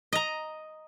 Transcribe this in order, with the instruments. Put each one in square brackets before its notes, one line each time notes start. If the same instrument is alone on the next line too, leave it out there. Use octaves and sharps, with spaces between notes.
[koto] D#5 A#5